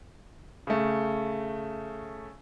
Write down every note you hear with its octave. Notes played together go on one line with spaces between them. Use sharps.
C#3 A3